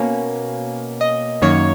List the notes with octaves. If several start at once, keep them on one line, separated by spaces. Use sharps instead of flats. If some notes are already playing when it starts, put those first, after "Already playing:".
Already playing: B2 A#3 C#4
D#5
F#2 D#3 A#3 C#5